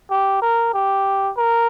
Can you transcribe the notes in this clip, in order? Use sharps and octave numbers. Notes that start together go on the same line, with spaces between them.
G4
A#4
G4
A#4